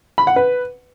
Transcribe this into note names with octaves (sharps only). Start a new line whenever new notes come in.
B5
F#5
B4